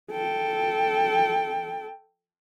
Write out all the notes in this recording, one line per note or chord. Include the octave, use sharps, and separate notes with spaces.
A4 G5